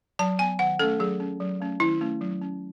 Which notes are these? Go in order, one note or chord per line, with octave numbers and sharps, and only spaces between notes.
F#3 A5
B3 G#5
D#3 F#5
A3 C#4 A4
F#3 G#4
C#4
F#3
A3 C#4
D#3 E4
A3 C#4
F#3
C#4